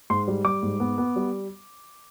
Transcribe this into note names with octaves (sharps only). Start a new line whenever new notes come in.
G#2 C6
G3
G3 D6
G#2
B3
B3
G3